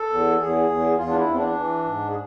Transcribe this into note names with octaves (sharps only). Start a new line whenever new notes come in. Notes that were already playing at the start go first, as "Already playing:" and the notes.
Already playing: A4
E2
E2 G#4
E2
E2 F4
D4
E4
E2 C4
D4
E3
G#2
G#4